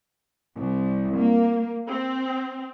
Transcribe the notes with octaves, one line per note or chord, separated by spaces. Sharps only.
C2
A#3
C4